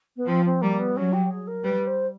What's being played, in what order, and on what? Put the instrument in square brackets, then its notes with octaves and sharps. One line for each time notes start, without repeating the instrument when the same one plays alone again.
[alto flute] B3
[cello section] F3 [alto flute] C4
[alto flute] C4
[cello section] G3 [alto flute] A#3
[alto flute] B3
[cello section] F#3 [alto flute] C#4
[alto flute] G4
G#4
A#4
[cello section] G3 [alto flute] B4
[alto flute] C5